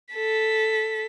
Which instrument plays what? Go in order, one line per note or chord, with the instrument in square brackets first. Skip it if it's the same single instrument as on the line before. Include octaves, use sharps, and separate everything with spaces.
[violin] A4 B6